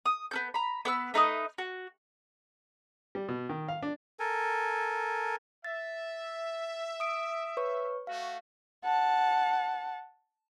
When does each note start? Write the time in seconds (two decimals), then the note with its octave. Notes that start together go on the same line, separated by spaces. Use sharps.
0.06 D#6
0.31 B3 C#4 G6
0.54 A#5 B5
0.85 B3 B4 E6
1.14 A3 D#4 B4 D#6
1.58 F#4
3.15 G3
3.29 B2
3.49 D#3
3.68 F5
3.83 D4
4.19 A4 A#4 G#5
5.64 E5 A6
7.00 D#6 D7
7.57 B4 C#5 C#6
8.07 A3 F#4 F5
8.85 F#5 A5